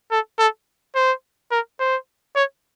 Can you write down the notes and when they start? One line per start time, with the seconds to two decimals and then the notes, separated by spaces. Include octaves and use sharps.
0.11 A4
0.39 A4
0.95 C5
1.51 A#4
1.79 C5
2.35 C#5